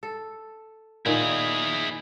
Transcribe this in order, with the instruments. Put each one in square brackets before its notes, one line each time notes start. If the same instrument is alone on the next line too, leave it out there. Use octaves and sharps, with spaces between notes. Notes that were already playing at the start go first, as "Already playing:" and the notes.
[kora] A4
[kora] A#2 D#3 [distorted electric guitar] E4 G#4